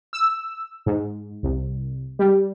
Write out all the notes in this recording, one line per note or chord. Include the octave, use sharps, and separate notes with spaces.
E6
G#2
C2
G3